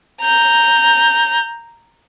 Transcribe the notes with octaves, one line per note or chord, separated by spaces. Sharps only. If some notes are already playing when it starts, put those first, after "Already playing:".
A#5 G6